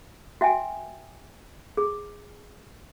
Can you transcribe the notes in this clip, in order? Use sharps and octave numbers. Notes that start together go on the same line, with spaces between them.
F#4 E5 G5 G#5
G#4